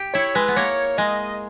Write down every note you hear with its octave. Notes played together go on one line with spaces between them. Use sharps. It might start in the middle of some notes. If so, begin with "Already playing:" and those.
Already playing: G4
E4 C#5
G#3 B4
B3
A#3 C#5
G#3 D#5